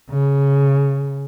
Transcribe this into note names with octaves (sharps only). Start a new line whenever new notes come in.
C#3